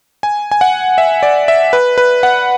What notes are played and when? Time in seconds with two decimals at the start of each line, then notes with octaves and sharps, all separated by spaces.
0.23 G#5
0.51 G#5
0.61 F#5
0.98 E5
1.23 D5
1.48 E5
1.73 B4
1.98 B4
2.23 F#5